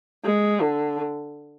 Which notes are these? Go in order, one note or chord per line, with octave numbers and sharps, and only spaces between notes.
G#3
D3